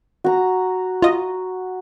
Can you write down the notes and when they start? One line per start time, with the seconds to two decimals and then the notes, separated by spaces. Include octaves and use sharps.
0.24 F#4 A#5
1.02 F4 D#5